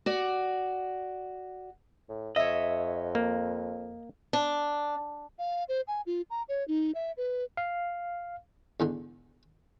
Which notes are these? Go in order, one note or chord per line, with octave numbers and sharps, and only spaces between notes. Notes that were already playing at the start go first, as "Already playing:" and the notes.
F#4 D5
A2
F2 C#5 D#5 E5
A#3
D4
F5
C5
G#5
F4
A#5
C#5
D#4
E5
B4
F5
E2 G#2 D3